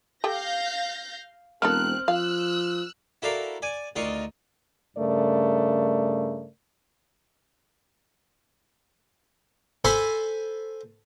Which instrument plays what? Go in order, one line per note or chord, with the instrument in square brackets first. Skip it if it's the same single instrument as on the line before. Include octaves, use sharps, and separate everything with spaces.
[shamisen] G4 A4 G5 [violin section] F5 G6 A#6
[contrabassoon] E1 [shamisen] A#3 D#4 A4 [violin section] C4 F#6 [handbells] F6
[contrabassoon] F3 [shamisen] F5 [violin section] E6 F#6
[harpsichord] E4 F#4 A4 A#4 D5 F5
D5 G#5
D2 D#3 F4 D5 D#5 C#6
[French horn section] G2 C#3 A3 A#4 D5
[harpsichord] A4 C5 G#5 B5 C6